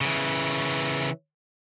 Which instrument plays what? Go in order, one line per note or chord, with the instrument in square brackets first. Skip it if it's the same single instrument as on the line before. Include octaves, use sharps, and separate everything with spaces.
[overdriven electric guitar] C#3 E3